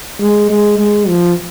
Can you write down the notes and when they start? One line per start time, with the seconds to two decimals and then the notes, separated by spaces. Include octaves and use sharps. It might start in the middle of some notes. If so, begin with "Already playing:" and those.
0.20 G#3
0.50 G#3
0.79 G#3
1.08 F3